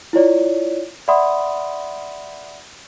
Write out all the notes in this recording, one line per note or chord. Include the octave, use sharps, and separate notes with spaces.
E4 F4 C#5 D5
D5 E5 F#5 B5 C6 D#6